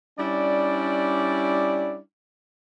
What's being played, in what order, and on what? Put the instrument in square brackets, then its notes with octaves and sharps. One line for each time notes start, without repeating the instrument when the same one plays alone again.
[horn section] G3 C#4 D4 E4 D5